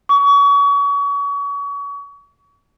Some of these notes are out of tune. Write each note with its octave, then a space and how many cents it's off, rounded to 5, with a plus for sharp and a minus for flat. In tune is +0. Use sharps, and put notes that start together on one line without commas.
C#6 +35